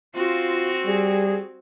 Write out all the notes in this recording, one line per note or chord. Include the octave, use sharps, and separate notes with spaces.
C4 F4 F#4
G3 G#4